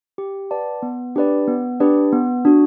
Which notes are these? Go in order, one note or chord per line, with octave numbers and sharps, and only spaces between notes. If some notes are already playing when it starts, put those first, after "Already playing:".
G4
B4 D5 F#5 A5
B3
D4 G4 B4 D5
B3
D4 G4 B4 D5
B3
D4 F#4